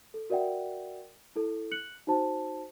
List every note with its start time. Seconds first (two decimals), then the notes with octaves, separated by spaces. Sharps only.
0.14 A4
0.30 F#4 A#4 D5 E5 F#5 G5
1.36 E4 A4
1.71 F#6 C#7 F#7
2.07 D#4 F#4 C5 A5